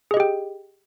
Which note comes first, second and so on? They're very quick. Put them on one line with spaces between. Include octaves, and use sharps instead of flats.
G#4 D#5 G4 G5